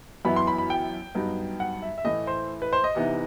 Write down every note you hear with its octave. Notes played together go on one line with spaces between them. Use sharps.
F#2 E3 B3 E4 B5
C6
B5
B5
G5
G2 F#3 B3 D#4
F#5
E5
E5
A2 E3 A3 D#5
C5
B4
C5
D#5
C3 E3 B3 D#4